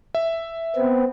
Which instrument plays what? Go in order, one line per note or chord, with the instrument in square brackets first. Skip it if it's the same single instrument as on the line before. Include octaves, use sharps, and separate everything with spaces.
[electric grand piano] E5
[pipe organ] B3 C4